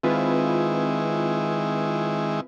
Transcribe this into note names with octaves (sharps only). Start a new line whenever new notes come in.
D#3 G#3 C4 E4 F4 B4